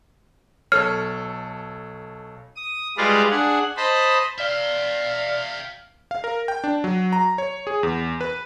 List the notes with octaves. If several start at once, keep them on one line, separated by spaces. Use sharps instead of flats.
B1 A4 C#5 F6
D#6
G3 G#3 F4 B4 D5 F5
D4 G#4 F#5
C5 D#5 A5 B5
D5 E5 F5 G5
F5
A#4
G5
D4
F#3
A#5
C#5
G#4
E2
B4